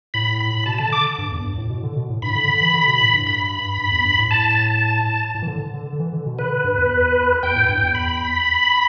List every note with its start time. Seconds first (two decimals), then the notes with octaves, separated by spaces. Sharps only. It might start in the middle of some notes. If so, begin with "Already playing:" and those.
0.14 A2 B5
0.40 B5
0.66 B2 A5
0.78 D3 A5
0.92 D3 D6
1.18 G2
1.31 E2
1.44 G2
1.58 A2
1.70 B2
1.83 D3
1.96 B2
2.10 A2
2.22 G2 B5
2.35 D3
2.48 D3
2.62 E3
2.74 D3
2.87 B2
3.01 A2
3.13 G2
3.27 B5
3.78 G2
3.91 E2
4.05 G2
4.18 A2
4.31 A5
5.35 A2
5.42 E3
5.47 D3
5.74 D3
5.87 D3
5.99 E3
6.13 D3
6.26 B2
6.39 D3 B4
6.64 G2
6.78 E2
7.43 E2 G5
7.56 A2
7.68 G2 G5
7.82 E2
7.95 B5